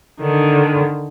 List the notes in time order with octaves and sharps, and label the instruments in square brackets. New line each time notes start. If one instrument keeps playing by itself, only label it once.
[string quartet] D3 D#3